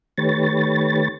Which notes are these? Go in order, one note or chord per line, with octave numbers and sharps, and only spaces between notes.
D#3 A3 G4 B4 C#5 A6